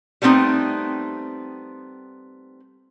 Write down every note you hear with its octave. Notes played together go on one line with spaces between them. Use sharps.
G3 A3 B3 C4 D#4